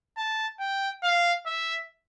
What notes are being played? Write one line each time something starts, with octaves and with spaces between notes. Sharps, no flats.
A5
G5
F5
E5